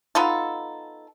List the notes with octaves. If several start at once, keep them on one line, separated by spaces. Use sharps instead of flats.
B3 D#4 F4 A4